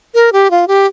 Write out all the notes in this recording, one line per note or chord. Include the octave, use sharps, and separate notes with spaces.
A#4
G4
F4
G4